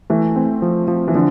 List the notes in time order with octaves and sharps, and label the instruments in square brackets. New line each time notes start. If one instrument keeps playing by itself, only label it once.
[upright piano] E3 [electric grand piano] A3
[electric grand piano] C4
F3
F3
[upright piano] E3
[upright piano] D3 [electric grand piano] F3